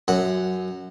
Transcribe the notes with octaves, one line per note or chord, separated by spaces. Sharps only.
F#2 F#5